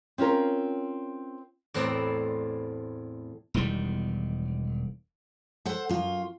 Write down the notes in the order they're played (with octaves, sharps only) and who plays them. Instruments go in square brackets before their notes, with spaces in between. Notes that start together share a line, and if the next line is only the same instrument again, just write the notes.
[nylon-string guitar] C4 C#4 F4 A#4
[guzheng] E2 A2 C4 B4 D5 A#5
[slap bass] E1 E2 D#3 G3
[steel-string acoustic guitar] A4 C5 F#5
F#2 F4